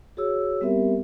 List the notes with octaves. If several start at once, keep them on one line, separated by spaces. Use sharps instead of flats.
F#4 G#4 C#5 E6
G3 B3 C4 G4 A#4 E5